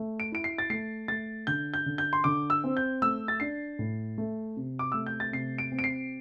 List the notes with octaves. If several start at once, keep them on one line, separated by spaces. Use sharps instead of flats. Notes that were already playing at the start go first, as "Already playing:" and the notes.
Already playing: A3
D7
E4 D7
C7
A6
A3 C7
A3 A6
D3 G6
G6
D3
G6
C6
D3 D6
E6
C4
G6
A3 E6
A6
D4 C7
A2
A3
C3
D6
A3 E6
G6
A6
C3 C7
D7
C4
D7
C7